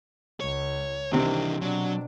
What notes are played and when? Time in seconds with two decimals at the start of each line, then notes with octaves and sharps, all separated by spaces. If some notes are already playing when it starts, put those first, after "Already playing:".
0.40 C#2 C#5
1.13 C3 D#3 E3 C4 D4
1.61 B2 F#3 D4